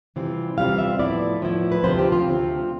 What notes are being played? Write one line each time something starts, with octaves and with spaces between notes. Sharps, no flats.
C3 E3 G3 C4 F4
C3 E3 G3 C4 F4 F5
E5
A2 F3 B3 E4 D5
A2 F3 B3 E4
B4
D2 C3 F3 C4 C5
G4
F4
D2 C3 F3 C4